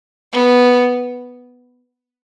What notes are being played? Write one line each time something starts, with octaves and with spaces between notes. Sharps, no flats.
B3